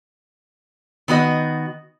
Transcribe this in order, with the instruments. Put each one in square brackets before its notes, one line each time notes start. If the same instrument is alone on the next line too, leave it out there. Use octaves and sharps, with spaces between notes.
[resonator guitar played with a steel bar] D#3 B3 F#4 D#5